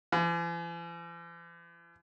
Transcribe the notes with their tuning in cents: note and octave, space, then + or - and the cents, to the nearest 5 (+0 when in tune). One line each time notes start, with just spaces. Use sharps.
E3 +45